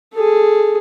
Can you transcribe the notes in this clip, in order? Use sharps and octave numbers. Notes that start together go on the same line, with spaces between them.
G#4 A4